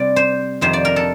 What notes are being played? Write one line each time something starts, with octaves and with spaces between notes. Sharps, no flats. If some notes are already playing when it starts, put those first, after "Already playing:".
Already playing: C3 G3 C4 D5
C5
F2 C3 D#3 C5
D5
A#4
A4